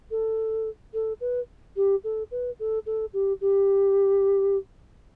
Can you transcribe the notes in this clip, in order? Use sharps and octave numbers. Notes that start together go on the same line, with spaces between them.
A4
A4
B4
G4
A4
B4
A4
A4
G4
G4